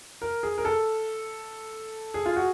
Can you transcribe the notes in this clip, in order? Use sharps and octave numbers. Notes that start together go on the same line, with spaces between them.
A#4
G#4
A#4
A4
G#4
F4
F#4